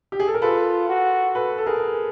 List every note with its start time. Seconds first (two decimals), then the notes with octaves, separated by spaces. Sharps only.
0.12 G4
0.20 G#4
0.28 A4
0.34 A#4
0.42 F4 A4 B4
0.89 F#4
1.35 A4 B4
1.58 A4
1.66 G#4 A#4